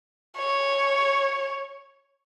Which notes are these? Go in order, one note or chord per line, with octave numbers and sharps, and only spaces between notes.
C#5